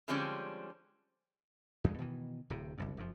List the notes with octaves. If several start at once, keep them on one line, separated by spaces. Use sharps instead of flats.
D3 F3 G3 G#3 C4 C#4
E2 G2 G#3
B2 D#3 E3
D1 A2 C3
F#1 C2 G2
F1 F#2 F3